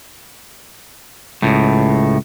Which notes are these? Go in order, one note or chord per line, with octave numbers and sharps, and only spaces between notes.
C#2 A2